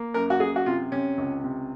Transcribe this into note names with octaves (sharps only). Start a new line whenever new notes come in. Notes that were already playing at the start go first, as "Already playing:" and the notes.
Already playing: A#3
F#2 A#4
F#4
F#2 G#4
F#4
C3 F4
C3 C#4
C#2
C3